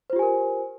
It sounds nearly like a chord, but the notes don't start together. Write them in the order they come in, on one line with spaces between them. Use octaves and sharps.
C5 F4 G4 G#5 A#4